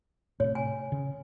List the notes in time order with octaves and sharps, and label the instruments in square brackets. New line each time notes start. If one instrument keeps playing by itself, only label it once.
[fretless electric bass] A2 C3 [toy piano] C#5
[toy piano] G#5
[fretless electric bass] C#3